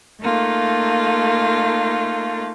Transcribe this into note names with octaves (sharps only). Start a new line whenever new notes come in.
A3 A#3 D#4 F4 A4